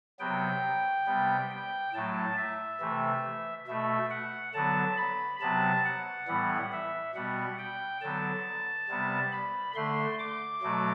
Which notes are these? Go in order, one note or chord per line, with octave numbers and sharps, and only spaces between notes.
C3 F#3 B3 G5
C3 G3 B3
G5
A2 F#3 A3 A5
E5
C3 E3 A3
B2 A3 E5
F#5
D3 F#3 B3 A5
B5
C3 F#3 B3 A5
F#5
A2 E3 G3 B3
E5
B2 G3 B3 F#5
G5
D3 F#3 B3 A5
C3 G3 B3
B5
D3 A3 C6
D6
B2 F#3 A3